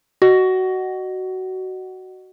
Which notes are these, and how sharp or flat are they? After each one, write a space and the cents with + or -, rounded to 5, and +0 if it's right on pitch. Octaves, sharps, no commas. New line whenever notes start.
F#4 +15 D#5 -30 F#5 +25